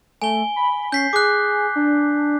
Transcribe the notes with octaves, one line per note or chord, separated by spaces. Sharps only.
A3 G#5 G7
B5
C#4 G6 B6 C7
G#4 D6 F#6
D4